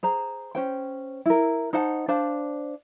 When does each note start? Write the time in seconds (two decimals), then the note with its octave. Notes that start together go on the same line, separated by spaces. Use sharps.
0.03 G#4 C5 A#5
0.55 C#4 C5 G5
1.26 E4 A#4
1.73 D#4 C5 F#5 A5
2.08 D4 C5 F5 A5